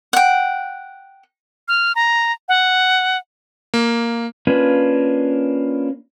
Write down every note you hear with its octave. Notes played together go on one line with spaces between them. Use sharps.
F#5 G5
F6
A#5
F#5
A#3
A#3 C#4 D4 F4 B4